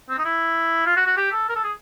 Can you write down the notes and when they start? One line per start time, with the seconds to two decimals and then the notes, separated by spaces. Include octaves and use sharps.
0.09 C4
0.18 D#4
0.25 E4
0.86 F4
0.96 F#4
1.07 F#4
1.17 G4
1.32 A4
1.49 A#4
1.56 A4
1.64 G#4